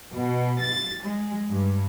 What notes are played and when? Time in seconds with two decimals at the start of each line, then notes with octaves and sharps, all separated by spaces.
0.12 B2
0.59 A6
1.03 G#3
1.51 G2